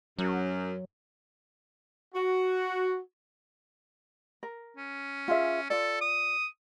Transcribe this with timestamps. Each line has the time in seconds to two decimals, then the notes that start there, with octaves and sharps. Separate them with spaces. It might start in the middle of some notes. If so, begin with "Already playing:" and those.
0.19 F#2 F#3
2.15 F#4
4.43 A#4
4.77 C#4
5.28 F4 G#4 E5
5.70 F4 A4 D5
6.01 D#6